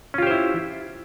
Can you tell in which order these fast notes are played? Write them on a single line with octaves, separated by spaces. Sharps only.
C#4 F4 G4 C5 E4